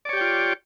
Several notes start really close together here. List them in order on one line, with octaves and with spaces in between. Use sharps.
D5 C#5 G4 G5 F4